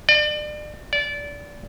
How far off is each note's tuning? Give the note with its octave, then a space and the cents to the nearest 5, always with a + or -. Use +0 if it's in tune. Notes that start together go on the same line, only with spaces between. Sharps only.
D5 +35
D5 -20